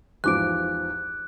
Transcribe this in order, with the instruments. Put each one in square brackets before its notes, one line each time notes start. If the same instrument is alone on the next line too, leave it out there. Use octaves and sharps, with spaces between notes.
[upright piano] E2 G#2 F3 [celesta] G4 D6 D7 [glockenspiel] F#6